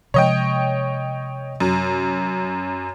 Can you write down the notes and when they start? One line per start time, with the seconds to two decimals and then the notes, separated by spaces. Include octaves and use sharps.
0.14 C3 F3 G#3 C#5 D#5 G5
1.60 F#2